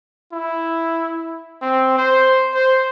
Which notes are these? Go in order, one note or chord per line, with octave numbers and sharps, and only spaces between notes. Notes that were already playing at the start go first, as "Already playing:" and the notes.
E4
C4
C5
C5